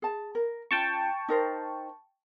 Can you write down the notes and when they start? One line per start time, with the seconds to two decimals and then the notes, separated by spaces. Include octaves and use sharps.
0.02 G#4 A5
0.35 A#4
0.71 C#4 F4 G5 A5 C#6
1.29 D#4 A#4 C5